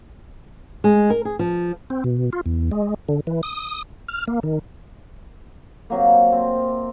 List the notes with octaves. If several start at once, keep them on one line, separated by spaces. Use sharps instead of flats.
G#3
A#4
G#4
F3
C4
B2
F4
E2
G#3
D3
E3
D#6
F6
A#3
D#3
C3 F#3 A#3
C4